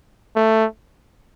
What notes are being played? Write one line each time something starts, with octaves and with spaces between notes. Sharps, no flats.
A3